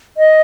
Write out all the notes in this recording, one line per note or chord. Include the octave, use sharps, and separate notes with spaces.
D#5